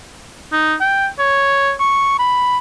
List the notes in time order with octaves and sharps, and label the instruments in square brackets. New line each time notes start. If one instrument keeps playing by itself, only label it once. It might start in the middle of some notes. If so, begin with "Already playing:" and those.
[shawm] D#4
G5
C#5
C#6
B5